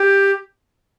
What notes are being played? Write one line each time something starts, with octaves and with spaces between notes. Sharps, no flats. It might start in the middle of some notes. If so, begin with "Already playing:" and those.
Already playing: G4